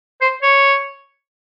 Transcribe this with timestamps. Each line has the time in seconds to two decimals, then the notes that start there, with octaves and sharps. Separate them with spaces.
0.21 C5
0.43 C#5